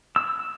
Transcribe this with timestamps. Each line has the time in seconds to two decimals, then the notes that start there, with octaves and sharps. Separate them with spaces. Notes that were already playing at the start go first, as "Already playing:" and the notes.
0.16 E6